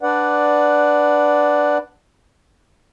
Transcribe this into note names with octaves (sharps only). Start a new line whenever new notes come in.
D4 B4 D5 F#5